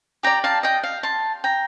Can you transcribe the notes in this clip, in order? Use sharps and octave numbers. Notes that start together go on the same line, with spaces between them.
G4 D5 G5 A#5
F5 A5
D#5 G5
F5
A5 C6
G5 A#5